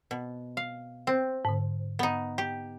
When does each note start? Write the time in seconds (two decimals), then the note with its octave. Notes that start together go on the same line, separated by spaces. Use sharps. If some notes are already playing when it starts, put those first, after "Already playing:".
0.11 B2
0.57 F5
1.07 C4
1.45 G#2 D3
1.99 B3 D#4
2.38 G4